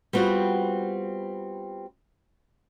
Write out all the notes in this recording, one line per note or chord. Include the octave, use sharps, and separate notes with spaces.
G3 B3 C4 F4 F#4